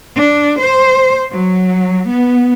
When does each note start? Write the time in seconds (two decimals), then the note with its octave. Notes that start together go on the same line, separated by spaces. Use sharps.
0.16 D4
0.60 C5
1.32 F#3
2.07 B3